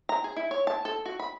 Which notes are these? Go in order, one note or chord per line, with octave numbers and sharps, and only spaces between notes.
A#5
G#4
E4
C#5
A5
A4
F#4
B5